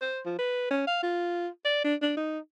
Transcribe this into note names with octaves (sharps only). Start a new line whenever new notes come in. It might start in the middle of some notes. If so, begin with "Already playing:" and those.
C5
F3
B4
C#4
F5
F4
D5
D4
D4
D#4